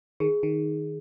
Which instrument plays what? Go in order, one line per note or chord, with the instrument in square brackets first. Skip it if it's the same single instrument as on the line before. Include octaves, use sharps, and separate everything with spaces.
[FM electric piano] D#3 [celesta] G#4
[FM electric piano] D#3